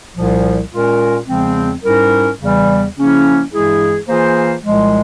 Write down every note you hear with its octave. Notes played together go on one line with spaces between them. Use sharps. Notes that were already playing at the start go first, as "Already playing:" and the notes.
C2 A#2 F3
A#2 G#3 C#4 F4 A#4
E2 C#3 F3 G#3 C4
G#2 G3 C#4 E4 A#4
E2 C#3 E3 G3
C#3 F3 A#3 C#4 E4
G2 E3 G#3 E4 G#4
E3 A#3 F4 G#4 C5
C2 A#2 F3 G#3